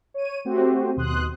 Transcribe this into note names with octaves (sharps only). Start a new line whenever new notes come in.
C#5 D#7
A3 C4 F#4 G4 C5
D#2 B2 C6 D#6 F#6